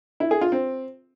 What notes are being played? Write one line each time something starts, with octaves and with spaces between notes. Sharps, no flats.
E4
G#4
F4
C4